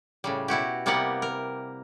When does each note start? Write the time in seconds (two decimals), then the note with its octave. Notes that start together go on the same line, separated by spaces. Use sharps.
0.24 A2 C#3 G3
0.48 B2 E4 F#4 G4
0.86 C3 G3 A#3 B3 G4 F#5
1.22 A#4